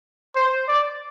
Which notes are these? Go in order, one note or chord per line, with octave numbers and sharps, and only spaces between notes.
C5
D5